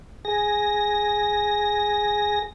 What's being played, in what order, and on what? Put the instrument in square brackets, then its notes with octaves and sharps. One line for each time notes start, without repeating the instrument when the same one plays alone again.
[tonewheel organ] G#4 A#6